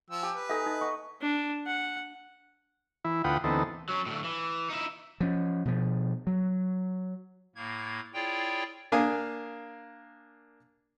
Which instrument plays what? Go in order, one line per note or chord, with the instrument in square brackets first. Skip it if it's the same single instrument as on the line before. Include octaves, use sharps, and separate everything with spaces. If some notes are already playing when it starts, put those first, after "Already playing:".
[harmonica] F3 G5 E6
[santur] G4 [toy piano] G#5
[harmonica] B4
[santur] D#4 G#5 A#5 [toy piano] A4 E5
[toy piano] D#4 [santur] F#5
[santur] D#5 F#5 C#6
[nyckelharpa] D4
F#5
[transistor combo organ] E3 E4
D2 F4 B4 F#5 G5 D#6
D2 E3 B3 C4 D#4 A4
[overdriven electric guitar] F#3 C#4
D2 A2
E3
D#4 E4
[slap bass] F3 C#4
B2 F3
F#3
[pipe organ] A2 A#3 G#6
E4 F4 G#4 C#5 D5 G5
[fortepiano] A#3 D4 F5 G#5 D#6